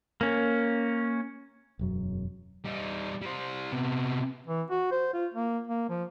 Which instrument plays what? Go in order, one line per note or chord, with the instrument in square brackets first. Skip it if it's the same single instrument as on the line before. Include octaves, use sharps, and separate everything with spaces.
[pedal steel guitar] A#3 C#4
[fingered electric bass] E1 F#2 F#3
[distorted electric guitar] G3 D#4
G3 C5
C3 B3
[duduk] E3
F#4
C5
F4
A#3
A#3
F3